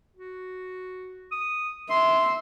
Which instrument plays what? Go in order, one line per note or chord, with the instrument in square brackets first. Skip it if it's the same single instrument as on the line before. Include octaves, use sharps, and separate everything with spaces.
[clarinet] F#4
D#6
[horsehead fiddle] E5 [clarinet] C6